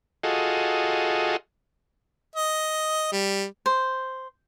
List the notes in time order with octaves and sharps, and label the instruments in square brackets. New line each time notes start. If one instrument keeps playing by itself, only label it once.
[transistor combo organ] F4 F#4 G#4 A4 D#5
[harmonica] D#5
G3
[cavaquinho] C5